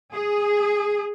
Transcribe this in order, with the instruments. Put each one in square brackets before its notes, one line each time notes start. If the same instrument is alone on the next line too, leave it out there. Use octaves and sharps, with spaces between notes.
[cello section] G#4